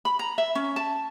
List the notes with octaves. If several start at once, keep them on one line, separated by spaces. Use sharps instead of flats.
B5
A#5
E5
C#4
A5